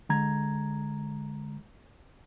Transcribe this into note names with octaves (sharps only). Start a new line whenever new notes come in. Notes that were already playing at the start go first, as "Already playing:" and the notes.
D3 G#3 A#5 G#6